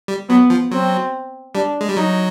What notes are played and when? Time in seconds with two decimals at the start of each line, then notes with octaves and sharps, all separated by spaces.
0.08 G3
0.29 F#3 B3
0.50 F3
0.71 F#3 C4
1.55 G3 D4
1.81 G#3
1.89 G3
1.97 F#3 D#4